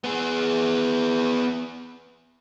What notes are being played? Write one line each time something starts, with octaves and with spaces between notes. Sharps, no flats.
B3 G#4